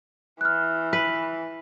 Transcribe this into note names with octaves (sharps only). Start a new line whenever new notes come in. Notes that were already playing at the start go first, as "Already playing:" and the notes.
E3 F6 F#6
B4